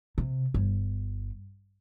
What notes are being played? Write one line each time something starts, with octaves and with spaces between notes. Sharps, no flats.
C3
G1